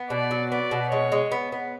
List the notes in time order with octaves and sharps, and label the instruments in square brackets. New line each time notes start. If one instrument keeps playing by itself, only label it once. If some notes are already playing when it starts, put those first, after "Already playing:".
Already playing: [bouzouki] B3
[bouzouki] B2 [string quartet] D5
[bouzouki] F#3
[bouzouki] B3 [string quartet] D5
[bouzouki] B2
[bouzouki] G#3 [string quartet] C#5
[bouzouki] G#3
B3
B3